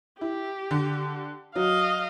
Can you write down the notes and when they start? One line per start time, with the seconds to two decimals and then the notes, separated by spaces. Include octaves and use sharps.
0.21 E4 G4
0.71 D3
1.55 F#3 D#5 F5